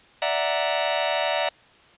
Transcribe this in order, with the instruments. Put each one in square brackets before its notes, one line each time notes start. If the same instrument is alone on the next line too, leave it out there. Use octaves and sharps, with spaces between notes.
[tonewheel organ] D5 E5 F#5 A#5